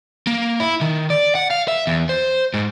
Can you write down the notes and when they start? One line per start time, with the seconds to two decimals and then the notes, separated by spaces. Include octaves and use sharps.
0.27 A#3
0.60 E4
0.81 D#3
1.10 D5
1.35 F#5
1.51 F5
1.68 E5
1.87 E2
2.09 C5
2.54 G#2